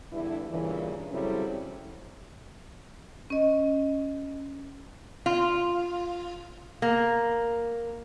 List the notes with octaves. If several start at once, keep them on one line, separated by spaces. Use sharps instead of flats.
E2 G2 D3 E4
G2 A#2 C#3 E3
C#3 F#3 G3 C4 E4 A4
C#4 D#5
F4
A#3